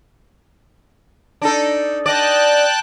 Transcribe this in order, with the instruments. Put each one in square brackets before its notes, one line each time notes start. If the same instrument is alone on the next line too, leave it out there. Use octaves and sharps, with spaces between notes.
[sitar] D4 D#4 A4
[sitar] D5 D#5 [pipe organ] G5 A5 F#6